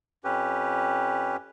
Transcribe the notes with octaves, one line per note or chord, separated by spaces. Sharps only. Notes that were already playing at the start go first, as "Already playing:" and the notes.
F2 C#4 G4 B4